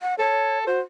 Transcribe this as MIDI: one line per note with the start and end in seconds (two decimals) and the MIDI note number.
0.01 0.15 78
0.19 0.64 69
0.19 0.59 73
0.67 0.80 66
0.67 0.81 72